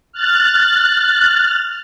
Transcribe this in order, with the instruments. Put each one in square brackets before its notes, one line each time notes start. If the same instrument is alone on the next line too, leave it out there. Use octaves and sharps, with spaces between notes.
[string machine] F6 F#6 A6